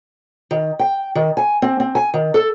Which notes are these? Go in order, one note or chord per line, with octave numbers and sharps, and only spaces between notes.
D#3
G5
D#3
G#5
C4
C4
G#5
D#3
A4